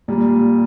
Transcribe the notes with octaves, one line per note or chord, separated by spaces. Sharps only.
A#2 G3